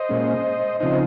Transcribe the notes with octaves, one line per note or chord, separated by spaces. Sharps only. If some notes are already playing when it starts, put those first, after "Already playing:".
Already playing: C5 D#5
A#2 G#3 C#4
C#3 F3 C4 D#4 C5 D#5